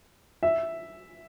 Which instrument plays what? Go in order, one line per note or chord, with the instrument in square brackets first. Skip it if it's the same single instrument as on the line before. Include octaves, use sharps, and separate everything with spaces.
[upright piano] E5